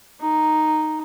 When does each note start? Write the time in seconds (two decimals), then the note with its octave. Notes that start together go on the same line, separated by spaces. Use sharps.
0.21 D#4